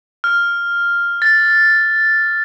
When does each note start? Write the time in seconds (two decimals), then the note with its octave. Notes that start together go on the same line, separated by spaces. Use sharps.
0.24 F6
1.22 A6